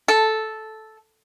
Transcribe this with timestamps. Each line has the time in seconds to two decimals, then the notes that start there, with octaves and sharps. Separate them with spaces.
0.08 A4